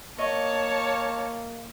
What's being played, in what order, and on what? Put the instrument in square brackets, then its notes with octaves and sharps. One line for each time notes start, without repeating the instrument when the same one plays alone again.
[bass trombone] A#3 [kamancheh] C#5 A5 [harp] D#5 C#6